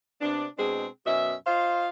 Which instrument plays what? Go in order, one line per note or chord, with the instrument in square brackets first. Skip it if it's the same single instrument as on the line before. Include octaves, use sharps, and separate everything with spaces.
[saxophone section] C3 B3 D4
B2 G#3 C4 D4 G#4
F#2 B2 C#4 E5
F4 C5 D#5 F5